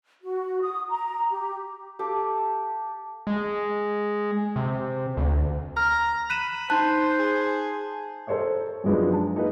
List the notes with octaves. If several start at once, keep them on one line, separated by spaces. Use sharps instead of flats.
F#4
D#6
A#5
G4
G4 A4 F5 D6
G#3
C3
D2
A#5 F6
B5 F#6 D#7 E7
D#4 C5 A5 F#6
G#4
A4 A#4 C5 C#5 D#5
F#2 F3 F#3 G#3 B3 D4
A5
A#3 D#4 G#4 B4